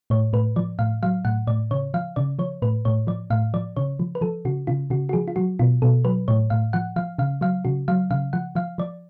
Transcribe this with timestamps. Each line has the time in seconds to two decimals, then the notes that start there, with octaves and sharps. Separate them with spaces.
0.10 A2 C#5
0.33 A2 B4
0.56 F3 D5
0.79 A2 F5
1.03 F#3 F5
1.25 A2 F#5
1.47 A2 D5
1.71 C#3 C#5
1.94 F3 F5
2.16 C#3 D5
2.39 F3 C#5
2.62 A2 B4
2.85 A2 C#5
3.07 F3 D5
3.30 A2 F5
3.54 F3 D5
3.76 C#3 C#5
3.99 F3
4.15 B4
4.21 F3 A4
4.45 C#3 F#4
4.67 C#3 F4
4.90 C#3 F#4
5.09 F#4
5.13 F3 G#4
5.28 F4
5.36 F#3 F#4
5.59 B2 F4
5.82 B2 A4
6.05 F#3 B4
6.28 A2 C#5
6.50 A2 F5
6.73 F3 F#5
6.96 F3 F5
7.18 C#3 F5
7.41 F#3 F5
7.65 C#3 F#4
7.88 F#3 F5
8.11 C#3 F5
8.33 F3 F#5
8.55 F3 F5
8.78 F3 D5